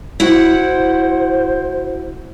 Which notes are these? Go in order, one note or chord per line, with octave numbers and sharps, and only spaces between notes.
E4 F#4 C5 F#5